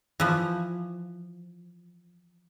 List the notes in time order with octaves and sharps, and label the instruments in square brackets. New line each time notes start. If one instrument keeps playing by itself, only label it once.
[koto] E3 F3